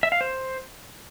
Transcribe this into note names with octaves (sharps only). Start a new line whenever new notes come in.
E5
F5
C5